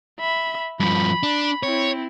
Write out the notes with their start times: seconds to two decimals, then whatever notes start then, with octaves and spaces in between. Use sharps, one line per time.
0.20 E5 B5
0.80 G2 F3 B5
1.23 D4
1.63 C4 E4 C#5